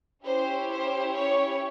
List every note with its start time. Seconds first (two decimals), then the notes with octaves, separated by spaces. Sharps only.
0.25 C#4 E4 G4 C5
0.70 C5
1.15 C#5